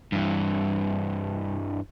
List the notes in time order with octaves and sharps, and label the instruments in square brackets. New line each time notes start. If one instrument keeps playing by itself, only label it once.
[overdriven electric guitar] G2 E3